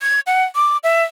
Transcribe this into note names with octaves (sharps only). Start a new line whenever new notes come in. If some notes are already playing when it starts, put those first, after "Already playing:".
G#6
F#5
D6
E5